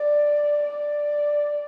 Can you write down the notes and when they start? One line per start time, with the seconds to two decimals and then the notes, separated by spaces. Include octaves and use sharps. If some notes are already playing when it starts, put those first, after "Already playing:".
Already playing: D5
0.66 D5